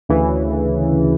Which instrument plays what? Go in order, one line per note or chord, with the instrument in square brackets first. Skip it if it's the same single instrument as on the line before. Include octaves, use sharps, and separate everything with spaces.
[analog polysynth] D2 C#3 E3